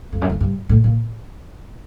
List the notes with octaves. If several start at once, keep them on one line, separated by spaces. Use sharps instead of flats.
F2
F#2
F2
G2
A2
A#2